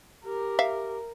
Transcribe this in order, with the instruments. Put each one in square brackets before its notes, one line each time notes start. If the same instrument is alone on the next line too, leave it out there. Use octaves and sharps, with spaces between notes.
[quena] G4 [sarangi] A#4
[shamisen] E5 F5